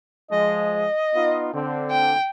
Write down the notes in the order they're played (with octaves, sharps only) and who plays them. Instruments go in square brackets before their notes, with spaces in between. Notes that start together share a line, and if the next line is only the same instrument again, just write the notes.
[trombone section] F3 G#3 [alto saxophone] D#5
[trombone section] B3 D#4 F4
D3 C4
[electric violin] G5